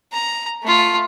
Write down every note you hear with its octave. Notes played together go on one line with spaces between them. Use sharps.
A#5
A3 F4